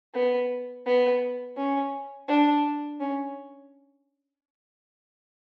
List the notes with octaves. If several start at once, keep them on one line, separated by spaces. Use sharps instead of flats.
B3
B3
C#4
D4
C#4